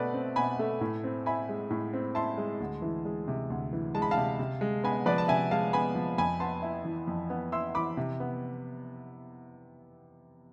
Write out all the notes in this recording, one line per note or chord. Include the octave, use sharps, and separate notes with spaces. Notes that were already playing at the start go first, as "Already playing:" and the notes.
Already playing: B2 A3 B4 D5
C4
B2 G#5 B5
A3
A2
C4
E4 G#5 B5
G#3
A2
C4
E4 A5 C6
G#3
D2
E3
G#3
C3
D2
E3
G#3 A5
B5
F5 A5
C3
C3
G#3
B3 G#5 B5
F3 B4 D5
A5
C3 E5 G#5
G#3 F5 A5
B3 G#5 B5
F3
F2 G#5 B5
B3 A5 C6
E4
E3
F2
B3
E4 C6 E6
E3 B5 D6
C3
B3